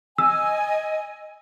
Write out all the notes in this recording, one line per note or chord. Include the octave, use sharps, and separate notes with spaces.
D#5 G#5 E6